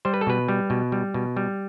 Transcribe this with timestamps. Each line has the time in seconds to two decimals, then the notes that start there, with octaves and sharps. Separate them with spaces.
0.05 G3 C5
0.14 B4
0.21 A4
0.27 B2 B4
0.48 G3
0.70 B2
0.92 G3
1.14 B2
1.37 G3